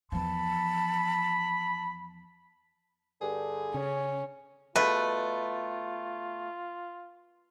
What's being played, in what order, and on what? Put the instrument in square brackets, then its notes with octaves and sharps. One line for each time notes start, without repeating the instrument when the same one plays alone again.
[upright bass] E2 F3 [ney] A5 [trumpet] B5
[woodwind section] G2 D3 [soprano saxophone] G#4
[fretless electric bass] C#3 [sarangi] C#4
[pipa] B2 A3 [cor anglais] F4 [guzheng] B4